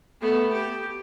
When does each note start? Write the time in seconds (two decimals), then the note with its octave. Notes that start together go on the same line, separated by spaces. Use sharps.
0.21 A3 B3
0.52 G4